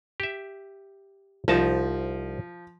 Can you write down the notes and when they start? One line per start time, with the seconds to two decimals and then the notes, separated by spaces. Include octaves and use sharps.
0.20 G4 E5
1.48 C2 F3 D#4 A5